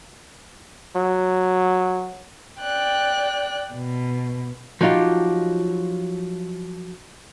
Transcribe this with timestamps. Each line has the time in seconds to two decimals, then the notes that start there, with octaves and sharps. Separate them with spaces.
0.96 F#3
2.61 D5 G5 F#6
3.73 B2
4.81 F3 F#3 D#4 F4 G4